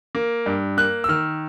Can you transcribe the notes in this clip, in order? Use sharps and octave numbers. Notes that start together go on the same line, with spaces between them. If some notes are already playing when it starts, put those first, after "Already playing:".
A#3
G2
A#3 F#6
E6
D#3 F6